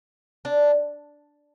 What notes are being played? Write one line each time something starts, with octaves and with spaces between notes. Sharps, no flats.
D4